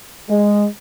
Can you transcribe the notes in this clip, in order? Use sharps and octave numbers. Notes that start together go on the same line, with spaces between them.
G#3